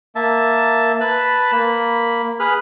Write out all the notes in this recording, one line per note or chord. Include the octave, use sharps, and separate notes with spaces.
A#3 E5 A5
B4 A5 B5
A#3 B5
G#4 B4 B5 F6